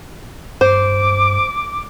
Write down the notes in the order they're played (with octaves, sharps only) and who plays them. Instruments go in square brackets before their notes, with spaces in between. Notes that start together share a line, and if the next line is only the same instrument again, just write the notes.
[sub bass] G2 [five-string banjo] C5 [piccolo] D6